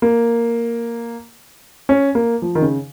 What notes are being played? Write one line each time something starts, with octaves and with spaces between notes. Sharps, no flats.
A#3
C#4
A#3
F3
D#3
C#3